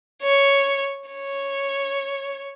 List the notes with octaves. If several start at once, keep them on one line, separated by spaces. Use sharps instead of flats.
C#5
C#5